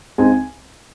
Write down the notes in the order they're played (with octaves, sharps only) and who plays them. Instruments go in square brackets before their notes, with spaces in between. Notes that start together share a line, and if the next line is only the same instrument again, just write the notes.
[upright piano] C#2 C#3 G#3 C4 D#4 G#5